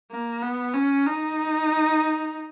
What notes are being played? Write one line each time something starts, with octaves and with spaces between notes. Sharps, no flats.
A#3
B3
C#4
D#4